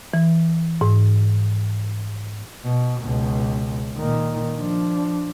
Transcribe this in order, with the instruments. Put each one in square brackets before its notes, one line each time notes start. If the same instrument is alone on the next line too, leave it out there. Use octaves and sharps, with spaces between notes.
[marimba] E3
G#2
[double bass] B2
C#2 B2
A#2 D#3
F3 D4